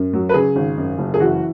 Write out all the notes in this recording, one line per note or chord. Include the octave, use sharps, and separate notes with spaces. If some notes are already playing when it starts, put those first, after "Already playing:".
Already playing: F#2
F#3
B4
C#3 G#4
G#1
F#2
F#1
G#4
E3 F#4